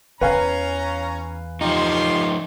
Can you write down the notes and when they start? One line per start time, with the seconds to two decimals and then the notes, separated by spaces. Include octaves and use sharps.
0.21 E2 C#4 B4 F5 G#5 A#5
1.61 F3 D#4 F4 G4 C6